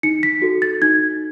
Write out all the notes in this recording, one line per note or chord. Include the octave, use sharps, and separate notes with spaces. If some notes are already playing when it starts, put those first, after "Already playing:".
D#4 C#7
B6
F#4 A4
A6
D#4 G#6